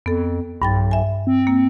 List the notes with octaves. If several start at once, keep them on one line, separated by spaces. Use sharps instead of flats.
F2 B3 A4
B1 G2 G5 A6
E5 G#5
C4
A#3